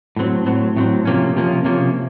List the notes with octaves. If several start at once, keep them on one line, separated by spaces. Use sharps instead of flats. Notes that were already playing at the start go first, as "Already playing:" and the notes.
A2 F#3 C4
A2 F#3 C4
A2 F#3 C4
C3 F3 A#3 C#4
C3 F3 A#3 C#4
C3 F3 A#3 C#4